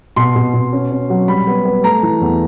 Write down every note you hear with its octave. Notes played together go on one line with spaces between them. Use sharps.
B2 C6
B2
B2
C#4
C#4
F#3
G3 B5
B3
B3
A3 A#5
E3
E2